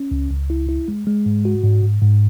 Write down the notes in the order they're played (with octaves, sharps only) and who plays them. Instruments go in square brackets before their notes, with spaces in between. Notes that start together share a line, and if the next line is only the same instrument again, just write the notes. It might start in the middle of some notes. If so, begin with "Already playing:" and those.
Already playing: [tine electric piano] C#4
C#2
C#2
E4
E4
G#3
G#3
G#2
F#4
G#2
G#2
G#2